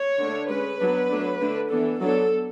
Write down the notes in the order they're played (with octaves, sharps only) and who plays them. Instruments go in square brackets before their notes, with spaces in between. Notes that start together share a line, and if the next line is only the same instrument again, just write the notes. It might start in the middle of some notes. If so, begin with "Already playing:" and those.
Already playing: [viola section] C#5
D3 A3 D4
G#3 C#4 B4
F#3 B3 D4
F#3 A3 D4
D3 A3 D4
E3 B3 D4 A4
F#3 B3 D4 A4